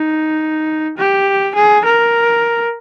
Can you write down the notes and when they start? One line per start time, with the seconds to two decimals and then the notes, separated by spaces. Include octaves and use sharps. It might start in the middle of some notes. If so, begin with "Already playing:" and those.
Already playing: D#4
0.97 G4
1.56 G#4
1.85 A#4